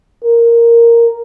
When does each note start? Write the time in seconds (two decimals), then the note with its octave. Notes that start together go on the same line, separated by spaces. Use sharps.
0.24 A#4